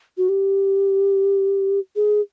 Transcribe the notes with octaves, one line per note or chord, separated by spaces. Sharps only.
F#4
G4
G#4